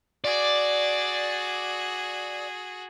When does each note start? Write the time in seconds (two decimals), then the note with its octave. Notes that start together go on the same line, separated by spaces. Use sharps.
0.24 F#4 G#4 D5